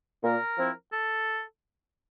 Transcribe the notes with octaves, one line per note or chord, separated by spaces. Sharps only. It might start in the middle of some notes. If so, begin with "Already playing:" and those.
A#2 A#4
F3 C4 E4
A4